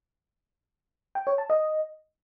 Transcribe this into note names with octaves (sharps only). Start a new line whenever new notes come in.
G5
C#5
A5
D#5